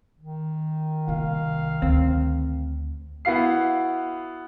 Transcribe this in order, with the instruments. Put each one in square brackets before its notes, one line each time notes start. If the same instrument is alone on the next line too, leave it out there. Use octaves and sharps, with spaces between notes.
[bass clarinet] D#3
[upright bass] C2 A#3 [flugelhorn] F5
[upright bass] D2 [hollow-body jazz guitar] C4
[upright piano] B3 E4 F#4 F5 C7